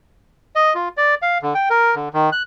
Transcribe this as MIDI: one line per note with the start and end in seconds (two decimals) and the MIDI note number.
0.55 0.73 75
0.75 0.89 65
0.97 1.15 74
1.22 1.38 77
1.42 1.54 50
1.55 1.69 79
1.70 1.95 70
1.95 2.09 50
2.14 2.30 51
2.32 2.43 90